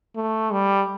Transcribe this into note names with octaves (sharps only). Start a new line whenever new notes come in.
A3
G3